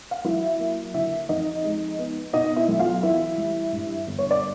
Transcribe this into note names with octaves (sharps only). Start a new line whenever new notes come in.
F5
F#3 E4 E5
A#3
D3 E4 E5
F2 D#4 D#5
G#3
B3
B2 D#4 D#5
E4 E5
B1
F4 F5
E3 E4 E5
G3
G2
G1
C#5
D5